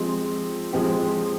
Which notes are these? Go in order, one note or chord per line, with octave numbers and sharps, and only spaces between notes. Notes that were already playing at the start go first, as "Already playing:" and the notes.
Already playing: F3 G#3 C4 G4
F3 G#3 C4 G4